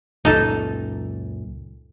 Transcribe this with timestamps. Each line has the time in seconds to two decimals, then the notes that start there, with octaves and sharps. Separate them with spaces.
0.25 C#2 F#2 A#2 D#4 A4